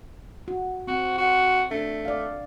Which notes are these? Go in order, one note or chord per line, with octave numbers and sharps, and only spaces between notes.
F#4
C4 F#4
F#4
A3 D4
D5 F5